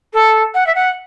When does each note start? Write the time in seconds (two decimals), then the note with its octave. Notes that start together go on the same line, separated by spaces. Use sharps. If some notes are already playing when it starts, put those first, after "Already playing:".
0.13 A4
0.54 F#5
0.67 E5
0.75 F#5